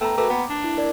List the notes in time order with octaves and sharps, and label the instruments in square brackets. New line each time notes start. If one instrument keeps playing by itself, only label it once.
[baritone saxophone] A3 [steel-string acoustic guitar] B3 [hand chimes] G5 A#5
[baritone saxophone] A3 [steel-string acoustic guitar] F#4 A#4 B4 [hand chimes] D6
[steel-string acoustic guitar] A#3 [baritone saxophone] B3
[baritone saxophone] D4
[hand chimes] E4
A#4 D5